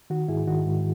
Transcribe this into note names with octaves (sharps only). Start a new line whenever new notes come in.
D#3 F#4
G#2 E4 G#4
D#3 F#4
G#2